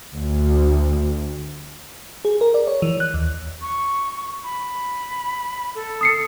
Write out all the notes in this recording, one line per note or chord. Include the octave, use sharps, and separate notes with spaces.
D2
G#4
A#4
D5
C#5
E3
F#6
D#2
C#6
B5
A4
D#6 C7 C#7